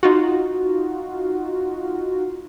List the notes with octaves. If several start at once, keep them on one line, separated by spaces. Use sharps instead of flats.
D#4 F4 F#4